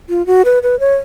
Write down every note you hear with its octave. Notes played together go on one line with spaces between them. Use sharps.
F4
F#4
B4
B4
C#5